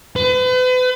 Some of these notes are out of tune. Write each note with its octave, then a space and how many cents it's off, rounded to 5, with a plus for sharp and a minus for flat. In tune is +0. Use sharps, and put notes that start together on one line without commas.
B4 +40